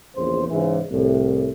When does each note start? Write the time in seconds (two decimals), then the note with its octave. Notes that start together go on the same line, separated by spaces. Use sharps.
0.16 A#1 E2 C#3 C5
0.48 G#2 C#3 E3
0.91 C2 A2